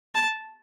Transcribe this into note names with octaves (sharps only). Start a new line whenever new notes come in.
A5